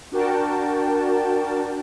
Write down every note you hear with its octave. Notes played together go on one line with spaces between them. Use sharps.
D4 F#4 A#4 G5 A5